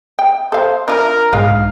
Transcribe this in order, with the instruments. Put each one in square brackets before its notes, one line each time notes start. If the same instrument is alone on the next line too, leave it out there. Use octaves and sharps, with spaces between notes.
[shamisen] G5
[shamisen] A4 F5 [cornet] C5
[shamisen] D4 E4 F4 [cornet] A#4
[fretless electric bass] B1 G#2 [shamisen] G#3 D4 F4 [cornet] F5